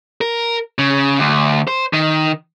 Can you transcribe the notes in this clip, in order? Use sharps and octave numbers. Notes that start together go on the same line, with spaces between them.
A#4
C#3
D2
C5
D#3